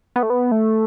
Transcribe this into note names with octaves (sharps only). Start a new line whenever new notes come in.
B3
A3
B3
A3